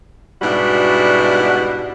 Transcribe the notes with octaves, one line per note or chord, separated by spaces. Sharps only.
G#2 B2 G3 D4 E4 F#4